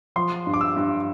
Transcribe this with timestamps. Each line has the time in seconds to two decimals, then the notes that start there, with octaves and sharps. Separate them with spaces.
0.16 F3 C6
0.47 G2
0.54 D6
0.61 E6
0.77 G2